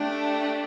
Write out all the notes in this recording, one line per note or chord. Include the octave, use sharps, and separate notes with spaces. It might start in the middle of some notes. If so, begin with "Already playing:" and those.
Already playing: A3 D4 G4